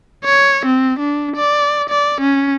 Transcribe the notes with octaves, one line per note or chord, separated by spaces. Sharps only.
C#5
C4
D4
D5
D5
C#4